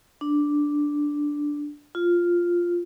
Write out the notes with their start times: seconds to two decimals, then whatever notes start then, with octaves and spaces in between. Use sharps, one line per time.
0.21 D4
1.95 F4